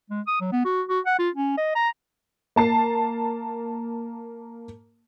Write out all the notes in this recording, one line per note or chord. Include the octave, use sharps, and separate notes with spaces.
G#3
D#6
F#3
B3
F#4
F#4
F#5
F4
C#4
D#5
A#5
A#3 A5 C7